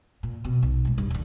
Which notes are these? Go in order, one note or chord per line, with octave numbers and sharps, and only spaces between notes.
A#2
B2
B1
A#2 G#3
G2
D#2 D3